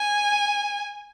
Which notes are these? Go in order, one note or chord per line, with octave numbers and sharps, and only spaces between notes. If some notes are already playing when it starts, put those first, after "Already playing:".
Already playing: G#5